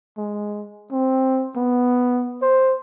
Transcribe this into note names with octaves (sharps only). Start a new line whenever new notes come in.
G#3
C4
B3
C5